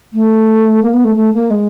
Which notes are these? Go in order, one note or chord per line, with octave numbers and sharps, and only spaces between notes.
A3
A#3
B3
A3
A3
A#3
G#3